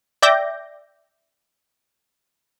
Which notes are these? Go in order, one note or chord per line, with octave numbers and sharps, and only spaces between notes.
D5 E5 G5 D6 G6 A#6